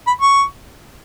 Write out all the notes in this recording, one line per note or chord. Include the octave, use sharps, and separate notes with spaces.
B5
C#6